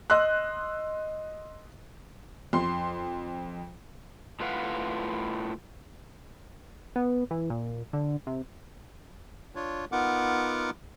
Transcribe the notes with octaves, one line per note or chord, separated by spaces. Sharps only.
D#5 C6 E6 F#6
F2 C6
A2 F4 B4 F5 F#5
B3
E3
A#2
D3
C3
D4 F4 C#5
B3 D#4 F4 A#4 F#5 D6